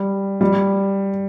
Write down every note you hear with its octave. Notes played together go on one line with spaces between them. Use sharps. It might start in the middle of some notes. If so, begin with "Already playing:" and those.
Already playing: G3
G3